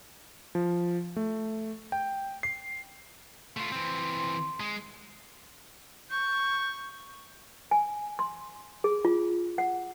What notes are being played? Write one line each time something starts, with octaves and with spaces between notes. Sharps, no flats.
F3
A3
G5
C7
A3 F4 C6
E3 C4
G#3
C#6 G6
G#5
C6
G#4
F4
F#5